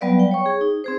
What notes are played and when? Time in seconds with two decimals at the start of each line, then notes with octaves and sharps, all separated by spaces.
0.01 F#3 G3 B3 B4 D5 F5
0.19 G5
0.31 C#5 C#6
0.46 G#4
0.61 D#4
0.84 C4 G#4 C5